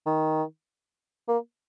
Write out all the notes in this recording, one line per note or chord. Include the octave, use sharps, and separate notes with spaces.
D#3
A#3